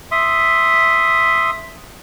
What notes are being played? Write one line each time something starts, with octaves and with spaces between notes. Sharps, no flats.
E5 C6 D#6